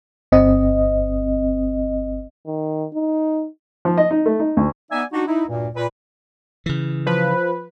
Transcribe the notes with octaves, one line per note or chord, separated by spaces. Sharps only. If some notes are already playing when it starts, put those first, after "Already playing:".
G1 C4 D#5
D#3
D#4
F3
D#5
D#4
A3
D#4
D2
B3 D#4 D5 E5 G#5
D4 D#4 F#4
D#4 E4
D2 G2 A#2
A#2 B4
C#3 E3
F3 B4